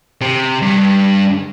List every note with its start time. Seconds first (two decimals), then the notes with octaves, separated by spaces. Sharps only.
0.21 C3
0.62 G2